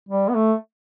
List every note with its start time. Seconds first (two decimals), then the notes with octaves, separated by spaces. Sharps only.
0.09 G3
0.29 B3
0.35 A3